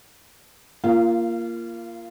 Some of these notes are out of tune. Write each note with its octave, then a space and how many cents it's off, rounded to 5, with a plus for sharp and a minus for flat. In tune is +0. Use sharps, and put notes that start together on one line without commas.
A#3 +0 F4 -25